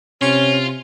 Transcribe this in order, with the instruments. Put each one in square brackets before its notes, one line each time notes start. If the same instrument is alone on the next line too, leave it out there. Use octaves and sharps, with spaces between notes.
[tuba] C3 [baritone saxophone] C#4 [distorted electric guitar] F4